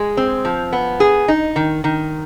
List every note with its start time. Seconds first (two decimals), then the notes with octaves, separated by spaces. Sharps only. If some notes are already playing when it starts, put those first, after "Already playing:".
Already playing: G#3 G#4
0.17 C4
0.45 F3
0.73 B3
1.00 G#4
1.28 D#4
1.56 D#3
1.84 D#3